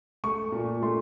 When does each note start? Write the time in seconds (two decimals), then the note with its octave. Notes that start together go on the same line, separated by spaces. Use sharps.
0.24 A3 C#6
0.52 A#2
0.82 A3 C6